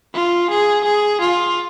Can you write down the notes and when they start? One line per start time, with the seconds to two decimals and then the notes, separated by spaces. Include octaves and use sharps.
0.14 F4
0.50 G#4
0.84 G#4
1.21 F4